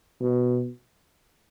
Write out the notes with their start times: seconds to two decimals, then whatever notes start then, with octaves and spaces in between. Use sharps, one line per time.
0.21 B2